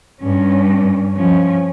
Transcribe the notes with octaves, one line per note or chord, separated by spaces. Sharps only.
G2 C#4
F3 C#4